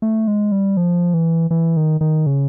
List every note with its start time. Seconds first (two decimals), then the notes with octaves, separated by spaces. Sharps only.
0.02 A3
0.27 G#3
0.52 G3
0.77 F3
1.14 E3
1.51 E3
1.77 D#3
2.01 D#3
2.26 C#3